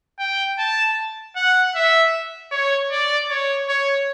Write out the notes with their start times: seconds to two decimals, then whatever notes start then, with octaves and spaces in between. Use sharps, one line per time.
0.19 G5
0.58 A5
1.36 F#5
1.75 E5
2.52 C#5
2.92 D5
3.30 C#5
3.69 C#5